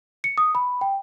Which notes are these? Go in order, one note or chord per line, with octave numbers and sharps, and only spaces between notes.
C#7
D#6
B5
G5